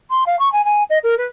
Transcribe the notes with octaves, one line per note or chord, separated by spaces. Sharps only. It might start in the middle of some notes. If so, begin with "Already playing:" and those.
C6
F5
C#6
G#5
G#5
D#5
A#4
B4